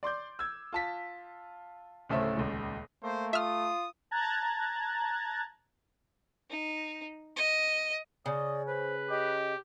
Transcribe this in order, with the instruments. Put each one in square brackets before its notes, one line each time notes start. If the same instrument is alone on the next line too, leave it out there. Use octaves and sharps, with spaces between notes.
[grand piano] D5 C6 D6 G6
E6 G#6
F4 A5 B6
D1 C#3 A3 A4 C5 E5
D#1 C#2
[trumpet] A3 [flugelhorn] A#3 [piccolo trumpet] C5
[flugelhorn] F4 [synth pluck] E5 F6 [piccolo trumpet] D#6
[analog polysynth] A5 A#5 F#6 G#6 A6
[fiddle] D#4
D#5
[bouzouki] C#3 [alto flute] D5 [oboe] D#5
[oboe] B4 [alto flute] C5
[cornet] G4 [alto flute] D#5